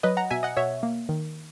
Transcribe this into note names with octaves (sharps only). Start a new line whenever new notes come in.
F#3 B4 D#5
F#5 A#5
B2 E5 G#5
D#5 F#5
B2 C#5 E5
A#3
D#3